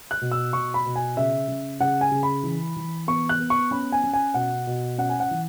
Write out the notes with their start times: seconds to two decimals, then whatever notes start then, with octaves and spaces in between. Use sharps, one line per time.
0.11 F#6
0.21 B2
0.32 E6
0.53 B2 C#6
0.74 B5
0.85 B2
0.96 G#5
1.17 C#3 E5
1.48 C#3
1.80 C#3 F#5
2.01 G#5
2.12 C#3
2.23 B5
2.43 E3
2.76 E3
3.07 B3 C#6
3.29 F#6
3.39 B3
3.50 C#6
3.71 C#4 B5
3.92 G#5
4.04 C#4
4.14 G#5
4.34 B2 F#5
4.67 B2
4.98 C#4 F#5
5.09 G#5
5.20 F#5
5.31 E3